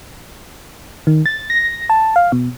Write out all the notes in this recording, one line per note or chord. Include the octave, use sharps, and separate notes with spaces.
D#3
A6
A#6
A5
F5
B2